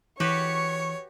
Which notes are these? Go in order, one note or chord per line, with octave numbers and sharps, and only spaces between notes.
E3 F#4 G4 B4 C#5 C#6